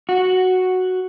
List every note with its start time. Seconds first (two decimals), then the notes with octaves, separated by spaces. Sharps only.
0.09 F#4